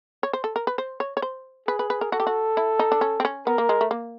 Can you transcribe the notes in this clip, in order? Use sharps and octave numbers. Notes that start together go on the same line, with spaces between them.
C#5
C5
A4
A#4
B4
C5
C#5
C#5
C5
G#4 B4
B4
B4
A#4
F#4 A4
G4
F#4
E4
D#4
D4
C#4
C4
C#4
B3 A#4
A#3
G#3
A3
A#3